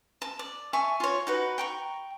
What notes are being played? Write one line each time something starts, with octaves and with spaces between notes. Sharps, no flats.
A5
D5
E5 G#5 A5 C#6
F4 C#5
D#4 F#4 B4
G5 A#5 C#6